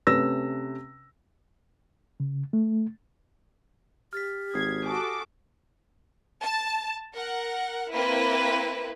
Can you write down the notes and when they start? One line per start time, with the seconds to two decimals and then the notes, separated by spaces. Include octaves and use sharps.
0.07 C3 A3 C#4 B4 E6 A#6
2.20 C#3
2.53 A3
4.13 G4 F6 A6 B6
4.54 G#1 D#6 G#6 C7
4.86 F#4 A4 G#5 D6 D#6
6.43 A5
7.14 A#4 F#5
7.94 A#3 C4 E4 B4